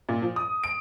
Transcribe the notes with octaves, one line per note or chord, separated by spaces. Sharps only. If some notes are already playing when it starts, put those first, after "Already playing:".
A#2
F3
D#6
D7